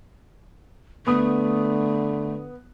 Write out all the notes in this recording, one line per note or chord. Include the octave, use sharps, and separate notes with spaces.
D3 A3 B3 D#6